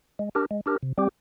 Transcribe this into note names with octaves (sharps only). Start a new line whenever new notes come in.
G#3
D4 G4 A#4
G#3
D4 G4 A#4
C3
G3 C4 G4